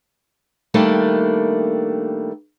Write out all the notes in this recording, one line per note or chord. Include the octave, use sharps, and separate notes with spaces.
D#3 G3 A3 A#3 D4